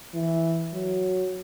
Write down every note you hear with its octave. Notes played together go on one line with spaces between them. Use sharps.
E3
F#3